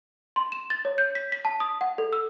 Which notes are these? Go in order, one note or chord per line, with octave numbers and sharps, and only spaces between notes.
C6
E7
A6
C#5
G6
B6
B6
A5
D#6
F#5
A4
E6